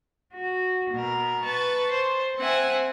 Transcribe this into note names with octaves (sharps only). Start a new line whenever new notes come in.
F#4
B2 A#4
B4 A5 C#6
C5
C4 E5 F#5 G#5